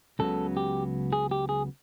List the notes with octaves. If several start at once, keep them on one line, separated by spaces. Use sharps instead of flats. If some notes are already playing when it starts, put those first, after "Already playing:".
C#2 C#3 F#3 B3 A4
G4
G#4
G4
G#4